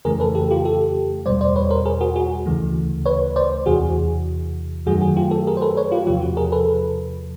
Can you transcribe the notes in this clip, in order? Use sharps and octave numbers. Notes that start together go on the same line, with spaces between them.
F2 C#3 E3 A3 G#4 A#4
A4 B4
G4 A4
F4 G4
G4 A4
E2 B2 G3 C5 D5
C5 D5
B4 C#5
A#4 C5
G#4 A#4
F#4 G#4
F#4 G#4
D2 C#3 E3 A3
B4 C#5
C5 D5
E2 C3 E3 F#4 G#4
F#2 D#3 F#3 A3 F#4 G#4
F#4 G#4
F4 G4
G4 A4
G#4 A#4
C5
A4 B4
B4 C#5
F4 G4
E2 C3 F3 F4 G4
F#4
G#4 A#4
A4 B4